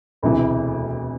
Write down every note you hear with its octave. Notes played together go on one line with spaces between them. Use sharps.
E1 D2 C3 E3